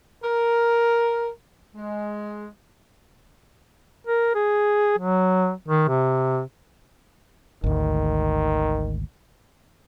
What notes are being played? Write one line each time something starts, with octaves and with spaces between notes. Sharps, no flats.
A#4
G#3
A#4
G#4
F#3
D#3
C3
G#1 D2 D#3